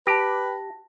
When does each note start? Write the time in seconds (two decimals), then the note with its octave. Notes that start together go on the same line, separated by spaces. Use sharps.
0.07 G4 B4 A5 A#6